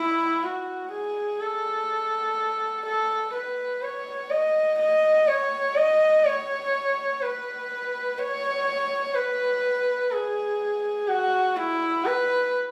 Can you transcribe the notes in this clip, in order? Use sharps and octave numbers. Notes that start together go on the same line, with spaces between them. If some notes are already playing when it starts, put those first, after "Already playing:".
Already playing: E4
F#4
G#4
A4
A4
B4
C#5
D#5
D#5
C#5
D#5
C#5
B4
C#5
B4
G#4
F#4
E4
B4